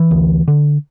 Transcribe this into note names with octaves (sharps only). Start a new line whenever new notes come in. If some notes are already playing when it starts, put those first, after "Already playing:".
Already playing: E3
D2
D3